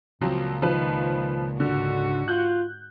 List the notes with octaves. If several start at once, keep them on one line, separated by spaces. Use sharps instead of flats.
C#2 A#2 F3 F#3 C4
D#3 F3 B4
G#2 D3 F#4
F4 F#6 G6